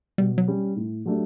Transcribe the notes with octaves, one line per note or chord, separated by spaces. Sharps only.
B2 G3
F#3
G3 C#4
A2
F#3 A3 D4 G4